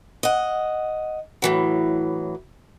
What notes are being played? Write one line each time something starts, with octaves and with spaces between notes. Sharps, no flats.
D#5 F#5
A2 E3 F#3